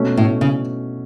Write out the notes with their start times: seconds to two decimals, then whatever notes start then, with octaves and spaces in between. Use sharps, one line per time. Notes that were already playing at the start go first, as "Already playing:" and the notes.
Already playing: B2 A3 C#4
0.17 A2
0.41 C#3